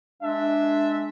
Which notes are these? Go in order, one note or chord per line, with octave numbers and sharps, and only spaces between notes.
G#3 D4 E5